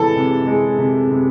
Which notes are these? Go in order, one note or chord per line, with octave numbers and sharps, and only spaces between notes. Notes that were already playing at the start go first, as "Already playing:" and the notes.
Already playing: C3 E3 G#3 A4
C3
G#3
C3
C3